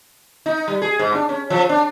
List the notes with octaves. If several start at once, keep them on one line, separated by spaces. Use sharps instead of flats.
D#4
G3
G#4
G#2
D4
C#4
F3
D4